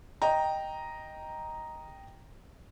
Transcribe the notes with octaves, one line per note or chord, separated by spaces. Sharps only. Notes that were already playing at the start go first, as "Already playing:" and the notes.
D#5 G5 A#5